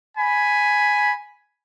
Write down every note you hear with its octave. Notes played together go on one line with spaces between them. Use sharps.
G#5 B5